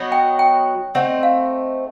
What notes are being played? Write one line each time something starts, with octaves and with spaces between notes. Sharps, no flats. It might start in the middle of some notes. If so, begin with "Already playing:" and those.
Already playing: F#3 B3 D#4 F#4
G5
G5
A3 C4 D#4 F#5
F5